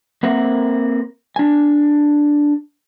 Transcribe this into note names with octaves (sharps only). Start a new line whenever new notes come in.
A#3 C4 A#4 C5 E5 F#5
D4 G#5